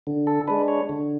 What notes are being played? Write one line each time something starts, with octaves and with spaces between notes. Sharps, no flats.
D3
A4
G#3 D4 B4
C#5
D3